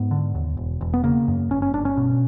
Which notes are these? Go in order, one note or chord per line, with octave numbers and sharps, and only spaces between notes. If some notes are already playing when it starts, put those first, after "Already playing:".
Already playing: G#2 B3
D3
D#2
E1
E1
B3
C#3 A#3
F#2
G1 C#4
C#4
G1 D4
C#4
B2